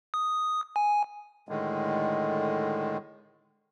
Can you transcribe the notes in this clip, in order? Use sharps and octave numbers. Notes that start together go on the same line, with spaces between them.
D#6
G#5
A2 D3 D#3 G#3